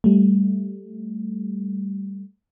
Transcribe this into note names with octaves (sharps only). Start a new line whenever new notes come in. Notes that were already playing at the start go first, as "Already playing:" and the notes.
G3 A3